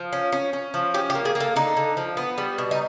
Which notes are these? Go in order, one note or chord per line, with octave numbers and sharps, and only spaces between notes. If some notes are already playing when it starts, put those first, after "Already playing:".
Already playing: F3
C#4
C#4
C#4
F3
C#4 G4
G4
A#3
G#4
A#3
A4
D3 D#4
D3
F3
B3
G3
B2
D#4